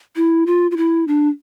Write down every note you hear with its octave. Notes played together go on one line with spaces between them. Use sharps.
E4
F4
F4
E4
D4